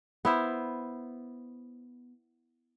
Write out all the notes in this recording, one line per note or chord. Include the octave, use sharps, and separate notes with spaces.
B3 E4 C5